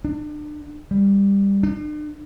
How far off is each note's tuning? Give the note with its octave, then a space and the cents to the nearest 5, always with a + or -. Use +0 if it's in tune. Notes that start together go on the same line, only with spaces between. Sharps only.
D4 +35
G3 +15
D4 +45